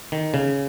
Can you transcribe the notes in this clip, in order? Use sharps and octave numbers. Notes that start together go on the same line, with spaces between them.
D#3
C#3